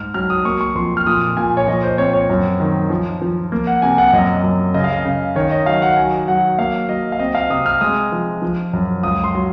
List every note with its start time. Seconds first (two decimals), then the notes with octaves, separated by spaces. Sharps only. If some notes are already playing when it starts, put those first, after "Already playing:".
Already playing: G#2 F6
0.14 F#3 F6
0.30 D#6
0.45 A#3 C#6
0.61 C#6
0.75 F2 C6
0.97 F6
1.07 A#2 D#6
1.37 A#2 G#5
1.57 C#5
1.67 F3 D#5
1.83 C5
1.98 C4 C#5
2.13 C#5
2.30 F#2
2.60 D#3
2.90 F3
3.22 F3
3.52 A#3
3.67 F#5
3.82 C3 G#5
3.98 F#5
4.13 F#2 D#5
4.43 F#2
4.74 C#3 D#5
4.84 F5
4.93 D#5
5.05 C#3
5.36 D#3 C#5
5.51 D#5
5.66 F#3 F5
5.82 F#5
5.97 F#3 G#5
6.28 F#3 F#5
6.58 A#3 F5
6.89 F#3 D#5
7.12 F5
7.19 C4 D#5
7.35 F5
7.50 C3 D#6
7.66 F6
7.81 G#3 D#6
8.12 F3
8.42 F3
8.73 F#2
9.03 C#2 D#6
9.24 C6
9.35 F#3